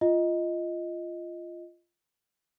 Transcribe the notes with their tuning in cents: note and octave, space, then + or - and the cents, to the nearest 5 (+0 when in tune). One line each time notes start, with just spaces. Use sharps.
F4 -10 D#5 +5